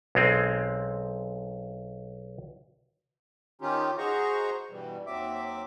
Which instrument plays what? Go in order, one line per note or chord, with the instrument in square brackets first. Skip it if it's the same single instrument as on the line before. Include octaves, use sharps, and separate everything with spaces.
[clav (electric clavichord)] B1 G#3 C4
[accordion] D#3 C#4 D#4 F4 G4
F#4 G#4 C5 D#5 A#5 C#6
G2 B2 E3 G3
D#2 F#3 C4 E5 D6